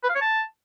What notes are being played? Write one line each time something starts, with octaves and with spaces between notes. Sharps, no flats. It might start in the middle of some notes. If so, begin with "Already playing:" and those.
B4
F5
C#5
A5